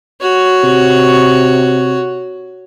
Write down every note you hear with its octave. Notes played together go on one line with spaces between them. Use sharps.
F#4 C#5
C3